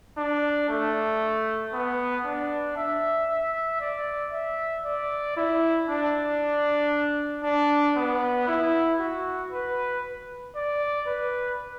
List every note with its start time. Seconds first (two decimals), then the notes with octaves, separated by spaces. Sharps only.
0.18 D4
0.69 A3
1.73 B3
2.25 D4
2.77 E5
3.29 E5
3.81 D5
4.33 E5
4.85 D5
5.37 E4
5.89 D4
7.44 D4
7.96 B3
8.48 E4
9.00 F#4
9.52 B4
10.55 D5
11.07 B4